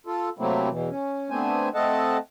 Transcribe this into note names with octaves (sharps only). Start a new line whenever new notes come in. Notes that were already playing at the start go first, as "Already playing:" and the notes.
F4 A4
C3 F#3 A3 A#3 C4 E4
E2 B2 E3
C#4
A3 B3 C4 D4 C5 G#5
A3 C4 A4 D#5 F#5 A5